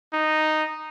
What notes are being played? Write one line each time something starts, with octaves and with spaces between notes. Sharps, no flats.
D#4